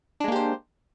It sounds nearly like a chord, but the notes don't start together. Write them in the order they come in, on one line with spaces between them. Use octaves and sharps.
D4 G#3 A#3 G4 C5